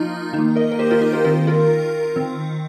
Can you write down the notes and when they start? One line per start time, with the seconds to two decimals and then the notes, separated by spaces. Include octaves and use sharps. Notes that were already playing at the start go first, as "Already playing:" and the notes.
Already playing: F3 A#3 D#4 F4
0.33 D#3 D#4
0.38 A#3
0.56 A#4 D#5
0.72 A#4
0.79 G4 C5
0.91 F4 A#4
1.01 D#4 G4
1.13 F4 A#4
1.24 D#3 C4 F4 A#4
1.47 F4 A#4
2.16 D#3 C4